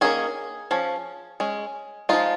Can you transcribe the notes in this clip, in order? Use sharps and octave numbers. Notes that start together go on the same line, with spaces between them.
D#3 A#3 C#4 G#4
F3 C#4
G#3 C#4
F3 G#3 D#4 F4